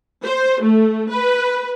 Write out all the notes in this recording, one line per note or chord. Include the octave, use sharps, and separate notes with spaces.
C5
A3
B4